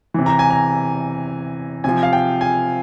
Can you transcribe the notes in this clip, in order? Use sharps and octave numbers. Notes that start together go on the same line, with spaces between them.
C3 E3
A#5
G#5
A#5
C3 F3 G#5
F5
G5
G#5